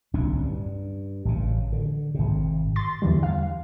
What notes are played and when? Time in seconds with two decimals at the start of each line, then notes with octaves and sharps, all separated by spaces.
0.13 D1 C2 C#4 D4
0.40 G2
1.25 A1 C#3
1.72 D3
2.15 G#1 C3
2.76 C6 A6
3.02 E2 D3 E3 G3
3.23 F5